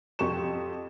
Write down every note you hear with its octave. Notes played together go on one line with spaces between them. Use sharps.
F2 G4 C#6 E7